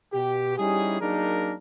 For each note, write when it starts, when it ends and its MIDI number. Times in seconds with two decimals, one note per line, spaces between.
0.13 0.55 47
0.13 0.55 67
0.58 0.98 55
0.58 0.98 61
0.58 0.98 63
0.58 0.98 64
0.58 0.98 67
0.58 0.98 68
1.00 1.54 54
1.00 1.54 58
1.00 1.54 62
1.00 1.54 63
1.00 1.54 68
1.00 1.54 70